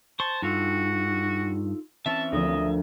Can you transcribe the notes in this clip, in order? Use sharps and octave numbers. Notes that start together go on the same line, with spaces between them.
C5 A5 C#6
G2 D#4 F4 F#4 A4
E3 C4 C#4 E5 A5
D2 F3 A#4 D#5